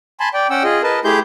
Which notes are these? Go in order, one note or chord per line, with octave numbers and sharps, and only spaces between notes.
G#5 A5 B5 C6
D5 G5
C#4 F#5 G5 E6
F4 G#4 D#5
A#4 B4 D#5 A5
A3 E4 G4 G#4 C6 G6